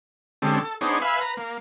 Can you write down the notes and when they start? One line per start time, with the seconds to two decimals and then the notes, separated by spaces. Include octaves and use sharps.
0.42 D3 G#3 C4 C#4 G4 A4
0.61 A4
0.81 B3 D4 D#4 G#4 C5 C#5
1.02 B4 E5 F5 G#5 B5
1.21 B4 A#5
1.37 A#3